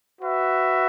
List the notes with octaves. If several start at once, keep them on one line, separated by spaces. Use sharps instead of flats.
F#4 B4 E5